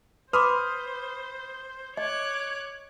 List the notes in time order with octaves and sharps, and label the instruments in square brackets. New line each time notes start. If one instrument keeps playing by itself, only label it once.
[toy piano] B4 C6 D6 [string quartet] C5 [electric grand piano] B5 D#6 F6
[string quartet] C#5 D6 F#6 [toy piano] D#5